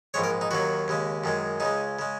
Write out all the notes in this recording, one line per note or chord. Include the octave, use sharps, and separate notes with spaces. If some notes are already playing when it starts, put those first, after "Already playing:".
A#1 G#2 G#3 C#5
A#4
D#4
D#2 D#3 F#3 F#4
D#2 C#3 G#3
F#2 D#3 G#3
C#2 C#3 G#3 D#4
C#3 G#3